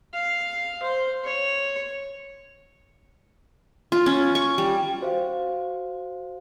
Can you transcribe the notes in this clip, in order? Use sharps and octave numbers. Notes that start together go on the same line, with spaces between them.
F5
C5
C#5
F4
C#4
C#6
G3
F#4 C5 F5